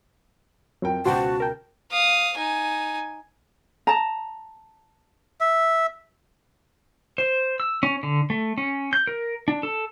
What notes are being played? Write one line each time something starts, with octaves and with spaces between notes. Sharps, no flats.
F2 F#3 A#4 G5
C#2 B2 F#4 C5 G5 A5
A#4 G5
F5 D#6
D#4 G#5
A5 A#5
E5
C5
E6
C#4
D3
A3
C#4
G6
A#4
D4
A4